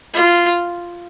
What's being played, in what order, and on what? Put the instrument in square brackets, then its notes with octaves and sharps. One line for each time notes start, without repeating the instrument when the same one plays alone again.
[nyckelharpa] F4